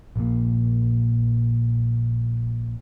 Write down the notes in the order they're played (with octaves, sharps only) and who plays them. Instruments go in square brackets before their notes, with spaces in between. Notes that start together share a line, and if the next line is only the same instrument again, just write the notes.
[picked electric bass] A#1 A#2